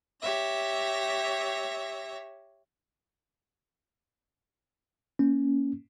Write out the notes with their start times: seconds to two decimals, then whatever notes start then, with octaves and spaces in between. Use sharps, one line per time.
0.21 G4 C#5 E5 A#6
5.19 A#3 C#4